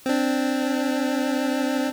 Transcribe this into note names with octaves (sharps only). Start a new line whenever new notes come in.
C4 D4